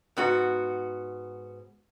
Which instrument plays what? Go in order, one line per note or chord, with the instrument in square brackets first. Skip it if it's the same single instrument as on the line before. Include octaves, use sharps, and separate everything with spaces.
[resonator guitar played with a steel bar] G#2 B3 F#4